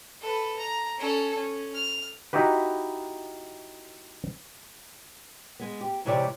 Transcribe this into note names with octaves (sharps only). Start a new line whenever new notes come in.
A4 B4
A#5
C#4 A4
C#4
F6
D#4 E4 F#4 G4 B4
G#3 B3
G4
G#2 C3 E3 G4 C#5 D5